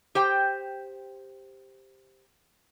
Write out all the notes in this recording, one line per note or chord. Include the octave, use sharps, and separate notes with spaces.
G4 C5 G5